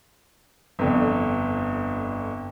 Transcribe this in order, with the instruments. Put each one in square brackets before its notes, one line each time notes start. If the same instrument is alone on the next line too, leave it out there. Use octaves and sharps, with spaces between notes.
[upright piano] G1 F2 D3